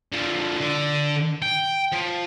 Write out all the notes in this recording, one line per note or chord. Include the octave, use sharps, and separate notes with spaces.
D3 F3
D3
G5
F3